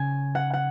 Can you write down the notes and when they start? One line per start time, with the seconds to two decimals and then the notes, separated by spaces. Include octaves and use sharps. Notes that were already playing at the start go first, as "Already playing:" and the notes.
Already playing: C#3 C#4 G#5
0.35 F#5
0.53 F#5